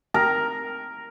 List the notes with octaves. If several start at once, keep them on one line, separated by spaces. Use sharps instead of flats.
A#4